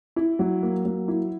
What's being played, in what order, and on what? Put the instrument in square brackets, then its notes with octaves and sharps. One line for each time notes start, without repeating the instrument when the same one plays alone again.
[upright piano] E4
F#3
A#3
F#3
E4